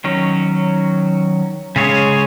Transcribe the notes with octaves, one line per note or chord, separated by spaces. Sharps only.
D#3 F#3 C#4
C#3 G#3 C#4 G#4 C#5